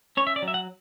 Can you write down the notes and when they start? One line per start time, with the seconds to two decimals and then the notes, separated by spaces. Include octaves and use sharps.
0.17 C#4 C#5
0.27 E5
0.36 D5
0.42 F#3
0.48 E5
0.54 F#5